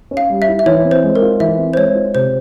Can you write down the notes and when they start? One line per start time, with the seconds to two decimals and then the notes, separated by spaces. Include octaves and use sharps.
0.11 C#4
0.17 F5
0.30 G3
0.42 E5
0.48 E4
0.59 E5
0.66 E3 C#5
0.85 C4
0.91 C5
1.04 G#3
1.15 A#4
1.22 F4
1.40 E3 E5
1.58 C4
1.73 C5
1.77 G#3 C#5
1.95 F4
2.15 C3 C5